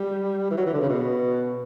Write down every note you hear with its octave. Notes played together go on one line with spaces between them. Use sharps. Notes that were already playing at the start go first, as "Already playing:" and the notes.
Already playing: G3
E3
F#3
E3
D3
C#3
B2